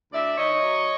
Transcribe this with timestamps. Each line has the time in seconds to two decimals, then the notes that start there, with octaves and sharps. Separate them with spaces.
0.13 D2 D5 E5
0.38 D#3 C#5 D#5
0.62 F#3